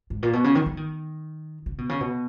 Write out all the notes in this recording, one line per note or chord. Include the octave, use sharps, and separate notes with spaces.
G#2
A#2
B2
C#3
D#3
F3
D#3
C#3
B2
C#3
B2